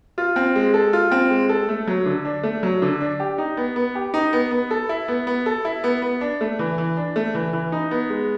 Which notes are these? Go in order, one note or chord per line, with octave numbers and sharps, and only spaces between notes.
F4
C4
G#3
A4
F4
C4
G#3
A4
A3
F#3
D3
D4
A3
F#3
D3
D4
G4
D#4
B3
B3
G4
D#4
B3
B3
A4
E4
B3
B3
A4
E4
B3
B3
D4
A3
E3
E3
D4
A3
E3
E3
D#4
B3
G#3